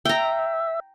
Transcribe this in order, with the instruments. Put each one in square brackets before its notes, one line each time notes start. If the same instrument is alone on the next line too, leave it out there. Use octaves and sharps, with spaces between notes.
[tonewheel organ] E5 [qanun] G5 A#5